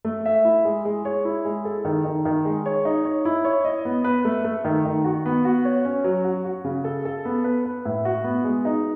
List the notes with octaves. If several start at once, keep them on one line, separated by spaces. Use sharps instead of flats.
A3
E5
E4
G#3
G#3
C#5
E4
G#3
A4
D#3
D#3
D#3
G#3
C#5
D#4
C#5
E4
C#5
D#5
B3
B4
A3
A3
D#3
D#3
F#4
B3
F#4
C#5
C#4
F#3
F#4
F#4
C#3
A4
A4
B3
B4
B4
A2
F#4
B3
G#3
D#4